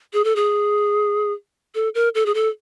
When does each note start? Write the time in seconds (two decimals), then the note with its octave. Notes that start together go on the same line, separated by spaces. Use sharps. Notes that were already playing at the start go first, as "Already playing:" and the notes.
0.13 G#4
0.24 A4
0.36 G#4
1.75 A4
1.95 A#4
2.15 A4
2.26 G#4
2.34 A4